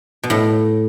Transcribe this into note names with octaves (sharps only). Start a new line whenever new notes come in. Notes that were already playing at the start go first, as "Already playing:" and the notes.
B2
A2